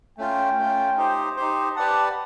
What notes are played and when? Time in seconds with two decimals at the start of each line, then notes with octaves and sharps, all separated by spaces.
0.18 A3 C#4 F4 G5
0.57 A3 C#4 F4
0.97 D#4 G4 C5
1.37 D#4 G4 C5
1.76 G4 B4 D5 F#5 A5